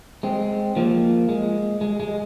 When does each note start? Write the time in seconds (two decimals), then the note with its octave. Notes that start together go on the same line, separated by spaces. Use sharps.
0.23 G#3 C4
0.76 F3 A#3
1.29 G#3
1.81 G#3
2.00 G#3